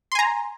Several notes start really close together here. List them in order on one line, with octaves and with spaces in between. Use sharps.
C6 G#5 A#5